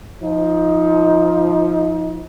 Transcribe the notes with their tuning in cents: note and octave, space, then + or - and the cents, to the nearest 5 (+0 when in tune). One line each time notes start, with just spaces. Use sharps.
F3 +0 D#4 +25